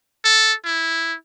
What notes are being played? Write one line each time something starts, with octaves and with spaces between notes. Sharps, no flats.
A4
E4